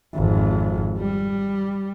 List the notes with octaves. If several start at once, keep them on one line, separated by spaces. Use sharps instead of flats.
G#1 F2
G3